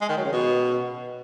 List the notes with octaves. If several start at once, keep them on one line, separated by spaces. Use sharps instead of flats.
G#3
D#3
F#3
C#3
B2